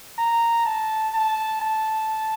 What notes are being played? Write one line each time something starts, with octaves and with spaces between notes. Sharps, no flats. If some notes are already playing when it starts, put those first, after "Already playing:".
A#5
A5
A5
A5